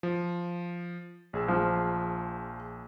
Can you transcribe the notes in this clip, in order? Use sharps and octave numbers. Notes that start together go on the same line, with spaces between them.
F3
A#1 G#4 E6
F3